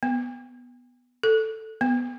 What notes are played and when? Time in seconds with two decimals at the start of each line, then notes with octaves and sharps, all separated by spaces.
0.03 B3
1.23 A4
1.81 B3